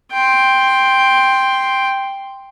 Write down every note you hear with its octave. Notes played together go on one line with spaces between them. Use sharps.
G5 C6